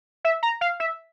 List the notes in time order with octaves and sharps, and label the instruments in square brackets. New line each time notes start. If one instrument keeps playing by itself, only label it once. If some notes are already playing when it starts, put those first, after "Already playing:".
[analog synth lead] E5
A#5
F5
E5